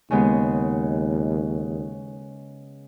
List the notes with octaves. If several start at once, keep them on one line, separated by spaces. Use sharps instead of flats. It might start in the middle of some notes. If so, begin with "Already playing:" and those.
D#2 C#3 G#3 B3